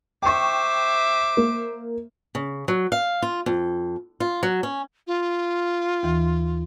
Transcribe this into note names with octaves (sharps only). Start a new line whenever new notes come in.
C5 E5 G5 C#6 D6
A#3
C#3
F#3
F5
F4
F2
F4
F#3
C#4
F4
D#2 E3